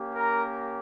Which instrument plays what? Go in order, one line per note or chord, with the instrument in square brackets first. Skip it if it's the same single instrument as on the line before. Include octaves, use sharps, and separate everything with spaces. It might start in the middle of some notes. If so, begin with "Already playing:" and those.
Already playing: [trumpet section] A#3 C#4 G4
A#4 A#5